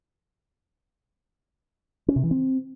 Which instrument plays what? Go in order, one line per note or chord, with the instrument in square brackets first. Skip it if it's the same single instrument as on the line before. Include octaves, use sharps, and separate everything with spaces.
[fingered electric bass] C#4
C3
E3
C4